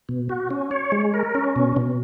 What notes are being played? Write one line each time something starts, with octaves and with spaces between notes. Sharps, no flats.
B2
F#4
C#4
C#5
G#3
A#4
C#4
B2
B2